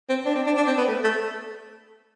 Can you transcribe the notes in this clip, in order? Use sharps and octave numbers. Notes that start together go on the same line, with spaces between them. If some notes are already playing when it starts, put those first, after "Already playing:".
C4
D4
C4
D4
D4
C4
B3
A3
A3